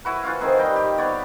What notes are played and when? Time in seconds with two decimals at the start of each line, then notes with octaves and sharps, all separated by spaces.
0.05 E4 F#4 B4
0.23 E3 F4 F#4 F5
0.41 D#3 C4 G#4 B4
0.59 G3 D#5 G5
0.76 G4
0.98 B3 C#5 D5